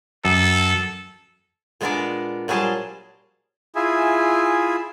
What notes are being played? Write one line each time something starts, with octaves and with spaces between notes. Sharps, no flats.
F#2 A4
A#2 G#3 B3 D4 A#4 D5
A#2 F#3 G3 G#4 C5 A5
E4 F4 G#4 E5 G#5